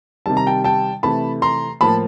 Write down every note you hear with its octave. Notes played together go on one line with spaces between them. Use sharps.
C3 D#3 G3 A5
A#5
G5 A5
G5 A5
C3 E3 A3 A5 B5
A#5 C6
A2 F3 A#3 A5 B5